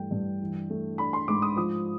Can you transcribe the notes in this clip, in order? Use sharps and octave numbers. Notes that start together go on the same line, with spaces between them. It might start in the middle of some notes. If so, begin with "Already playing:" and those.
Already playing: G2 E3 A3 G5
G2
E3
A3
D4 B5
C6
G#2 D6
D#6
F3 D#6